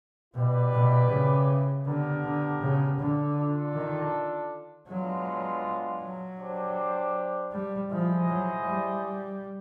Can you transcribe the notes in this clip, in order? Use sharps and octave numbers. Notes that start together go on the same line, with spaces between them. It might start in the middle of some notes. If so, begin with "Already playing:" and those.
B2 E4 G4 B4 D5
B2
C#3
D3 B3 D4 G4 A#4
D3
C#3
D3
D4 F4 A4
D#3
F#3 G#3 B3 D4 F4
F#3
D4 G4 C5
G3
F3 E4 G#4 C5 D#5
F#3
G3